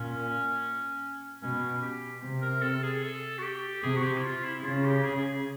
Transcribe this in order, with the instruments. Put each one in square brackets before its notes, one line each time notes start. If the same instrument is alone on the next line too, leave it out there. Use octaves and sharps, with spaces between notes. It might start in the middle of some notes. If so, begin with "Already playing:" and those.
Already playing: [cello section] A#2 [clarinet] C#4
[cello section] B2 [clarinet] C#4
[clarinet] G4
[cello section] C3
[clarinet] A#4
A4
G#4
A4
F#4
G4
[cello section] C3 [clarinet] G#4
[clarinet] F#4
G4
E4
F4
E4
E4
[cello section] C#3 [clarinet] F4
[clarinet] G4
G#4
G#4